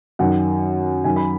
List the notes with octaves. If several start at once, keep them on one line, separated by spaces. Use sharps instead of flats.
F#2 D#3 F#5
F#2 D#3 G#5
B5